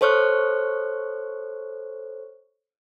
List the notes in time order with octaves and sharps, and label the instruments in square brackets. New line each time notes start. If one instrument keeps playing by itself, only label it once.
[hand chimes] A4 C5 C#5 C#6 F6 F#6